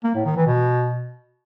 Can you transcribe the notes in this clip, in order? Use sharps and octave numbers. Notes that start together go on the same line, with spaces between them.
A#3
A2
D#3
E3
B2